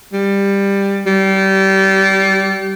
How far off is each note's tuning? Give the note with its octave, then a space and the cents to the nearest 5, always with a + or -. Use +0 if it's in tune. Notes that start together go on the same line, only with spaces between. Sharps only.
G3 +15
G3 -25